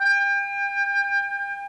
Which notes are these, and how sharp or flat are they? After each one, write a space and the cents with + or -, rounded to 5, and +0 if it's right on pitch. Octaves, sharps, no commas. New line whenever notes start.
G5 +35